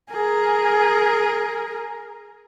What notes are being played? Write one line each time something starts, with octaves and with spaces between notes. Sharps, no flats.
G#4 A#4